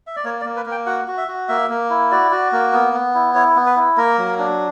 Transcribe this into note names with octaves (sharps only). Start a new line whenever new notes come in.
E5
D5
A#3 C#5
D5
A#3
B4
A#3
G5
F#4 F#5
F#4
E5
F#4
A#3 E5
A#3
E4
F#4 D5
F#4
A#3
B3
B3
E4
E4 C#5
B3
B4
E4
A#3 A#4
F#3
D4